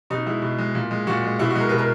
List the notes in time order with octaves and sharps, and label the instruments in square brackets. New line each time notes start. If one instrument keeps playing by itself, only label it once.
[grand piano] B2 D#4
G#3 E4
B2
G#3
A#2
G#3
A#2 F#4
G#3
B2 E4
F#4
G#3
A#4
B2 B4
A#4